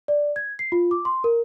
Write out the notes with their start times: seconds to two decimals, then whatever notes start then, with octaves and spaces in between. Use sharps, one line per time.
0.08 D5
0.36 G#6
0.59 C7
0.72 F4
0.91 D6
1.05 C6
1.24 A#4